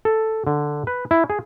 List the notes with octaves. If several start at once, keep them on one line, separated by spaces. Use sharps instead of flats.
A4
D3
B4
E4
G#4